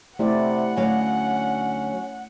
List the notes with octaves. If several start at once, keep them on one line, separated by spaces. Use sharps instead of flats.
C3 A3 E4 D5 F#5
D2 F#3 C#4 F5